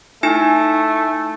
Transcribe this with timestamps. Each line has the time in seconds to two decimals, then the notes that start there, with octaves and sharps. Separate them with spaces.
0.23 A3 D#4 E4 G#5